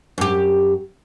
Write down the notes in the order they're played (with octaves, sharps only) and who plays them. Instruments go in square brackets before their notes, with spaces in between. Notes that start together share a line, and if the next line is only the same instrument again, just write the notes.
[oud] F#2 G4